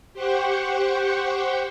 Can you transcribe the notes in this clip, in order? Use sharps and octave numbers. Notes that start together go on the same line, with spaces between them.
G4 C5 F#5 G5 C#6